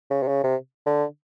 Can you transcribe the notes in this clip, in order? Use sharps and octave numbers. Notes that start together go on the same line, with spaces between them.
C#3
C3
C#3
C3
D3